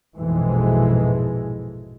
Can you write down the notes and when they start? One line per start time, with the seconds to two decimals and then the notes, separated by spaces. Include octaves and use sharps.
0.17 A#1 F2 G#2 B2 E3 G#3